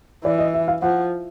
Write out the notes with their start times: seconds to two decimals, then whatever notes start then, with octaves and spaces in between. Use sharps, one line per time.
0.24 E3 D5
0.39 D#5
0.54 E5
0.68 F5
0.82 F3 F#5